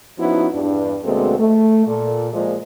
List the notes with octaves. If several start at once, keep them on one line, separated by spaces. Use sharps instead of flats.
F3 B3 C#4 D#4 E4 F#4
E2 G2 D4
D2 B2 G#3 A#3 C4 A4
A3
A#2 A4
A#2 F3 G#3